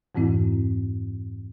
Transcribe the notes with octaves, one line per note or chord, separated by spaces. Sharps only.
F2 G#2 E3 C4 E4